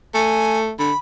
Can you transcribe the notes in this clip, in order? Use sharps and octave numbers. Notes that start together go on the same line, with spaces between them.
A3 G#5
D3 B5